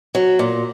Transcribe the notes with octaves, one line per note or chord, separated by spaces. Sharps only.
F#3
A#2